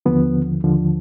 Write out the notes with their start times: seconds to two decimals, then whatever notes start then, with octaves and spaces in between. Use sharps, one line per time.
0.06 D#2 D3 F3 B3
0.63 D#2 D3 F3